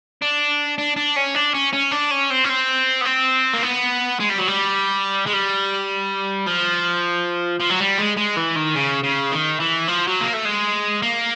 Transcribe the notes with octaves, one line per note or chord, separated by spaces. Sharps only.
D4
D4
D4
C#4
D4
C#4
C#4
D4
C#4
C4
C#4
C4
B3
C4
A#3
B3
G#3
G3
F#3
G3
G#3
G3
F3
F3
F#3
G3
G#3
G#3
E3
D#3
C#3
C#3
D#3
E3
F3
F#3
A#3
A3
G#3
A#3